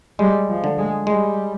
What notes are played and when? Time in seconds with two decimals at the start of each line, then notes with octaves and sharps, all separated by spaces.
0.19 G3 G#3
0.49 F3
0.64 D3
0.77 G#3
1.07 G3 G#3